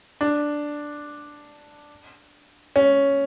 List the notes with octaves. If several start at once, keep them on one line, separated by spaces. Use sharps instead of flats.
D4
C#4